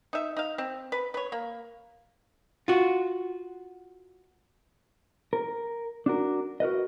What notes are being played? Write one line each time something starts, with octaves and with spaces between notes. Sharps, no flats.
D#4 E5
D#4 F5
C4
B4
B4 C#5
A#3
F4 F#4
A#4
D4 F#4 A#4
F#4 A#4 B4 D#5